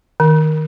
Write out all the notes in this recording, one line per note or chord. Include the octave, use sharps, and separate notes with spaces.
D#3